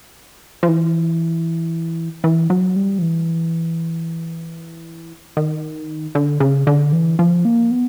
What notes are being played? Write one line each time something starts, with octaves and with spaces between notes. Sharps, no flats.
F3
E3
E3
F#3
G3
F3
E3
D#3
D3
C#3
D3
E3
F3
A#3
B3